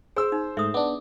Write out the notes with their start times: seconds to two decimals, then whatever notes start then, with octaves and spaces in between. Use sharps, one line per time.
0.16 G#4 C5 E6
0.32 D#4
0.57 G#2 A3 E5 D#6
0.74 B3 D4 D6